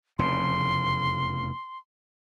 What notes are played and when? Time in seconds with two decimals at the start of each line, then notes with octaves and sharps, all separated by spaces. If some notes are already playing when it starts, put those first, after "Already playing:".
0.19 F1 E2 C#3 C6